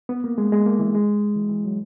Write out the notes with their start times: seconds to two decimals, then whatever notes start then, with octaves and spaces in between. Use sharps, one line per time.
0.09 B3
0.24 A#3
0.38 G#3
0.52 G#3
0.66 A#3
0.79 E3
0.94 G#3
1.36 E3
1.49 E3
1.65 F#3